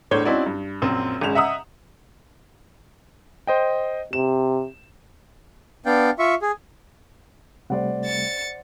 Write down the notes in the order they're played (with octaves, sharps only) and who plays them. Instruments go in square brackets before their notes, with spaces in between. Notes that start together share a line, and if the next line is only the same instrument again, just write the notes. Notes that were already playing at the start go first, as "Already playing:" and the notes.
[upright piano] E2 A2 D4 C5 C#5 G7
C4 C#4 D#4 E4 F#4 D5
G2
A#1 F#2 C4
G#1 G#3 C#4 E7 F7
D#5 E5 F#5 A#5 D#6 E6
[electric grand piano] C5 D#5 G5
[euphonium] C3 [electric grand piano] E7
[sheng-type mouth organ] B3 D4 D5 F5 G5
F4 E5 C#6
G#4
[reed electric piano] C3 G3 A3 [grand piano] C5 D5 F#5
[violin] A6 C#7